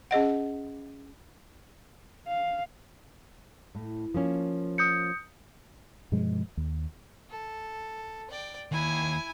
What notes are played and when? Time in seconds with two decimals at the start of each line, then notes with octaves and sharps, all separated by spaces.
0.11 C#4 G#4 D#5 F#5
2.28 F5
3.75 A2
4.14 F3 A#3 C#4
4.78 D#6 G6 C#7
6.12 G2 B2 F3 G#3
6.57 D#2
7.30 A4
8.30 D5 G5
8.72 D#2 E4 G#5